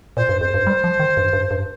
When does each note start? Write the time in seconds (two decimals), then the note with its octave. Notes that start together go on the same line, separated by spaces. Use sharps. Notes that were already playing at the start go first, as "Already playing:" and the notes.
0.17 A#2 C5
0.29 G2
0.41 F2 C5
0.54 G2
0.67 G3
0.84 F3
0.99 D#3
1.17 G2
1.33 G2
1.51 G2